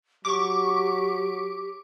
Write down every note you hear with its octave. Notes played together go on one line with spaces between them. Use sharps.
F#3 G4 C#6 D6